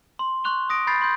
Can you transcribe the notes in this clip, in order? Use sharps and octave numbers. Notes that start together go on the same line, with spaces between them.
C6
C6 C#6 F#6 F7 G7
D#6 A#6 D7
B5 G6 A6 C7
B5 C6 G6